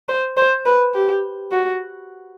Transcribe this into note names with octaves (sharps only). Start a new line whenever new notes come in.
C5
C5
B4
G4
F#4